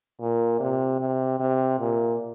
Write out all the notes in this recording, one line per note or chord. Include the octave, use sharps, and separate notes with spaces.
A#2
C3
C3
C3
A#2